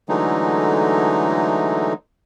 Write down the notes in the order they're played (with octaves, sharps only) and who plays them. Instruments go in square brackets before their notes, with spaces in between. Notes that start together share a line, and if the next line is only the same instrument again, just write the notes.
[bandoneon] D3 E3 F#3 G#3 A3 D#4